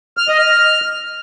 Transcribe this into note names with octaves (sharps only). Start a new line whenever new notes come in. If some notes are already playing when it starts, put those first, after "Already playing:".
F6
D#5
F6